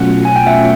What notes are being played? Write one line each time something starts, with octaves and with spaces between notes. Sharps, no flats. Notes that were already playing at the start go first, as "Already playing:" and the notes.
Already playing: B2 F#3 A3 C#4 F4 F#5
G#5
G5
E5 F#5